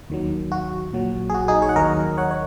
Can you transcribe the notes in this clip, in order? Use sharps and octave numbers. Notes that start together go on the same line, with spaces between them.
D#2 D#3 F#3
F#4
A#1 A#2 F#3
G#4
F#4
D#4 G#4
G#4 C#5
F#5
D#2 D#3 F#3 A#4 D#5
C#5 F#5
C#5